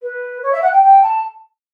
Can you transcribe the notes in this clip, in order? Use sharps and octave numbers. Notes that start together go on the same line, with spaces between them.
B4
C#5
E5
F#5
G5
G5
A5